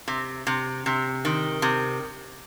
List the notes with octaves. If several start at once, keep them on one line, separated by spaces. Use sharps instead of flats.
C3
C3
C3
D#3
C3